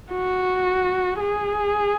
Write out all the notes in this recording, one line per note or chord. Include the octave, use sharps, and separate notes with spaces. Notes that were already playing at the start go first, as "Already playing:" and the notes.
F#4
G#4